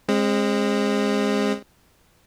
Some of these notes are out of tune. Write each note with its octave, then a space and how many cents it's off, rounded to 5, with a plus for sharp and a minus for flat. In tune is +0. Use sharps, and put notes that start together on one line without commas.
G#3 -15 C4 +30